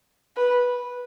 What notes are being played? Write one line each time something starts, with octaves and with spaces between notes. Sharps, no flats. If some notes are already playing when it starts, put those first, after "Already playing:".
B4